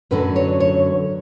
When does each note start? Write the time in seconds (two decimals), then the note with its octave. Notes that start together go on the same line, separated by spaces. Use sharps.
0.11 F#2 D3 F#3 B4
0.36 C#5
0.60 C#5